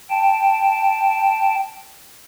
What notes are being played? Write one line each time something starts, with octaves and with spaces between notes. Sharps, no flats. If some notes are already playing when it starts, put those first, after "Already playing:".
G5 A5